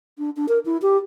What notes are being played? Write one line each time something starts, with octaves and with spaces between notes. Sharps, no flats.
D4
D4
A#4
E4
G4